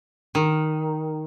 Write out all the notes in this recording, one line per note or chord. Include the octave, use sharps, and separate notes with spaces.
D#3